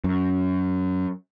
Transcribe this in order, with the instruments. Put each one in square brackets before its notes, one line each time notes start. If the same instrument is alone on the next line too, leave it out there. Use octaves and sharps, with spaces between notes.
[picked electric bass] F#2